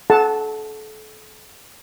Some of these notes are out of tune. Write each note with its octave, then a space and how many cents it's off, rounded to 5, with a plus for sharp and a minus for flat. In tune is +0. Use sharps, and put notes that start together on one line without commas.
A4 -35 F#5 -5 A5 +0